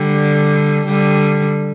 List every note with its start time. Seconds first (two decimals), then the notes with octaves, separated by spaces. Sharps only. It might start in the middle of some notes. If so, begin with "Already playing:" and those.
Already playing: D3 G3
0.86 D3 G3